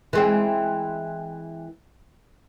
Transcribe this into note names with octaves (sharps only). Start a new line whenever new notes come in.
E3 G#3 C4